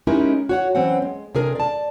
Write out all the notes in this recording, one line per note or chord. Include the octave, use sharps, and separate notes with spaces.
G#3 C#4 D#4 E4 G4 A#4
F#4 C#5 F#5
E3 F#3 C4 C#4 F#5
G#3
C3 D4 G#4 A#4
D5 A5